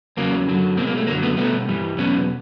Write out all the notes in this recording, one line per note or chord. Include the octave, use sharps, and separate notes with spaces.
E2 C#3 F#3 A#3
F#2 D3 F#3
B2 G#3 A#3 C4
A#3
A3
F#2 D3 F#3 A#3
A3 B3
B2 G3 A3 B3
G2 E3 G3
E2 B2 F#3 B3 C#4